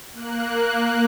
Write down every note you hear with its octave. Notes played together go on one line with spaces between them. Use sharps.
A#3 F#6